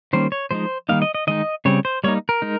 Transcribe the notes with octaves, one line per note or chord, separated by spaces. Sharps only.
D#3 G3 A#3 C#4 C5
C#5
F3 G#3 D#4 C5
D#3 G3 A#3 D#4 F5
D#5
D#5
D#3 G#3 D#4 D#5
C#3 G3 C4 C#5
C5
G3 A#3 D#4 C#5
A#4
G#3 D#4